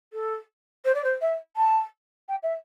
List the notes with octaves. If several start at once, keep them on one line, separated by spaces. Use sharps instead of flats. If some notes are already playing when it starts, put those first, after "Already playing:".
A4
C5
D5
C5
E5
A5
G5
E5